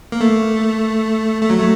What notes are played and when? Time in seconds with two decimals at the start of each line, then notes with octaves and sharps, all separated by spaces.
0.12 A#3
0.21 A3
1.42 A3
1.50 F#3
1.59 A3